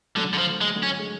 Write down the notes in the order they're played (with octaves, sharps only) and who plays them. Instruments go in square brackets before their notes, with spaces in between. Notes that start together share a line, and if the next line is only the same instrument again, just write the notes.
[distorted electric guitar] D3 [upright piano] F#3 A3
[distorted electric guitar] D3
F3
[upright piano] D3
[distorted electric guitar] G#3
[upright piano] D3 F#3
[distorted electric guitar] C#4
[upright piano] G#3